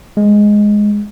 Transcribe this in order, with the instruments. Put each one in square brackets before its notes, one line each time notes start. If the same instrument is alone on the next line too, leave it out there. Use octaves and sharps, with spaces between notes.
[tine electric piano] G#3